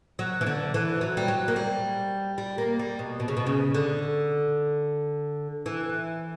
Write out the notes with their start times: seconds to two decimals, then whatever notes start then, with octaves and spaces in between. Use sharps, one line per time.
0.19 F#3
0.41 E3
0.46 D3
0.74 E3
1.01 F#3
1.17 G3
1.28 F#3
1.48 A#3
1.56 G3
2.38 G3
2.58 A#3
2.79 G3
2.99 B2
3.20 B2
3.28 C#3
3.37 B2
3.47 C#3
3.74 D3
5.66 E3